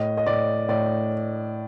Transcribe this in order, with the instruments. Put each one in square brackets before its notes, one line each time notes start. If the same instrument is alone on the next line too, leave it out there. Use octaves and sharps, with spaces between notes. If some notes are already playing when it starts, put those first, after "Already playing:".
Already playing: [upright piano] A2 D#5
D#5
A2 D5
A2 D5